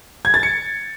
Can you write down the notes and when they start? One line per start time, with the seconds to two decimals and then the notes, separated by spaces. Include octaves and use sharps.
0.25 G#6
0.34 A6
0.43 C#7